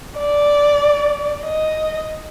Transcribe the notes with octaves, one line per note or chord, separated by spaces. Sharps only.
D5
D#5